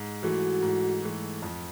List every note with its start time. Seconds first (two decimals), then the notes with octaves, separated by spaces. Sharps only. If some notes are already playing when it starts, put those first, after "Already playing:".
Already playing: G#2
0.23 E3 A3 F#4
0.63 G#2
1.02 E3 A3
1.42 F2